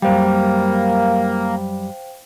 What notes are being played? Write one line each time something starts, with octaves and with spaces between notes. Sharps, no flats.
F#2 G3 A#3 C5 F5 G5